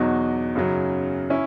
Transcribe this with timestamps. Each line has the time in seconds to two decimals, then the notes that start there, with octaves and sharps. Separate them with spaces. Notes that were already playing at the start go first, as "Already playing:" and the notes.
Already playing: E2 B2 F#3 D#4 F#4
0.55 F#2 C#3 F#3
1.30 C#4 E4